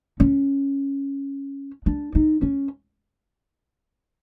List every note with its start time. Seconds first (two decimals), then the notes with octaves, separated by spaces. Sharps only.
0.20 C#4
1.86 D4
2.15 D#4
2.42 C#4